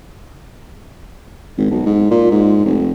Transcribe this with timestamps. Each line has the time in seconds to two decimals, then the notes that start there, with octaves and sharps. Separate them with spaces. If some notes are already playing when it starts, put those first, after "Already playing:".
1.57 G#1
1.71 B1
1.86 G#2
2.11 A#2
2.31 G#2
2.65 F1